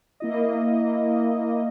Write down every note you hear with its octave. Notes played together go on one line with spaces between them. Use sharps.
A#3 E4 D#5